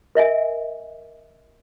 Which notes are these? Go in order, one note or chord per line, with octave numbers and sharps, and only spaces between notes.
A#4 D#5 E5 G#5